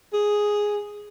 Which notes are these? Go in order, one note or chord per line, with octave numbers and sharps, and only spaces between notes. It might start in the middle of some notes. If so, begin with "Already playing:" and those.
G#4